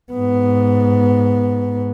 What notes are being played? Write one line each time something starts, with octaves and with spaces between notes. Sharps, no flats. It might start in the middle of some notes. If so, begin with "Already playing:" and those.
G#2 B3